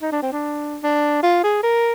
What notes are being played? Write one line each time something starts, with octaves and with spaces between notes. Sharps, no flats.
D#4
D4
C4
D4
D4
F4
G#4
A#4